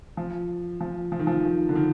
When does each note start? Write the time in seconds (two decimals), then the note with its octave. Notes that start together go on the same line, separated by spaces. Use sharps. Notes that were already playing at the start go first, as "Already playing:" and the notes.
0.17 F3
0.81 F3
1.12 F3
1.19 D#3
1.27 F3
1.44 D#3
1.69 D3
1.75 D#3